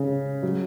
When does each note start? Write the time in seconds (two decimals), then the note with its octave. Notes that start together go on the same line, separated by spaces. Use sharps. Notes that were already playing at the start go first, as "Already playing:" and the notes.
Already playing: C#3
0.43 F#3